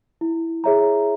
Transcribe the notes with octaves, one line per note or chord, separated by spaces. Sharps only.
E4
G#4 C#5 E5 A#5